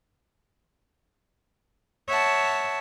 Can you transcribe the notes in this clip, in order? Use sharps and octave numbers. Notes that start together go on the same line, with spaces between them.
C#5 E5 F#5 A5